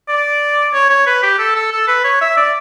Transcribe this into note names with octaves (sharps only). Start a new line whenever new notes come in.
D5
C#5
C#5
B4
G4
A4
A4
A4
B4
C#5
E5
D5